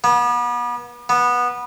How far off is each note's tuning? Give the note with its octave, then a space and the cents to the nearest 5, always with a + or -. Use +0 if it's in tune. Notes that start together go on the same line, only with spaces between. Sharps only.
B3 -35
B3 -15